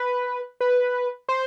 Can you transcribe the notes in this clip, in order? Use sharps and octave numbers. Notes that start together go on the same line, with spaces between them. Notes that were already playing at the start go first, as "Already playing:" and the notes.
Already playing: B4
B4
C5